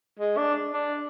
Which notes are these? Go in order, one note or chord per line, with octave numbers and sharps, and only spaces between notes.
G#3
D4
D4